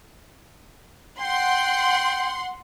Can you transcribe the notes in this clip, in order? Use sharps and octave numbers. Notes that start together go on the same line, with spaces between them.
F#5 G5 C6